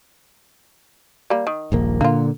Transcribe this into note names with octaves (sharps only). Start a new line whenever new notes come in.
G3 A#3
D#3
D#1 A#1 A#3
A#2 D3 A#3 F4